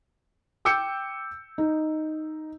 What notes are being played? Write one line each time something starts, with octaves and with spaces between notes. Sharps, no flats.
G5 D6 E6 G6 C#7
D#4